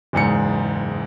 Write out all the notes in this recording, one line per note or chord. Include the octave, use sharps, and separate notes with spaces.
F#1 E2 G#2 C#7